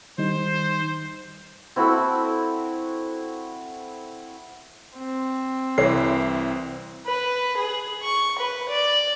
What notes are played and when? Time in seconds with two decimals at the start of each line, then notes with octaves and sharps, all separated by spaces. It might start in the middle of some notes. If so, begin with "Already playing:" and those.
0.18 D#3 G3 D#4 C5
1.76 C4 E4 F#4 A4
4.98 C4
5.78 C2 E3 A4 C#5 C7
7.06 B4
7.57 G#4
8.03 C#6
8.39 B4
8.69 D5